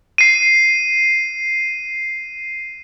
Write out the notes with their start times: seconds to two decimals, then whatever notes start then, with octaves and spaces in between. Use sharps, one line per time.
0.18 C7 D#7